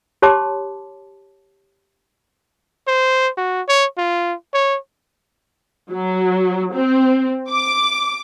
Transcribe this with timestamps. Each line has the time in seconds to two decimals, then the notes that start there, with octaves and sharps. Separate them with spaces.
0.22 G4 C#5 A5 C6 D6
2.87 C5
3.37 F#4
3.68 C#5
3.97 F4
4.53 C#5
5.90 F#3
6.73 C4
7.50 D6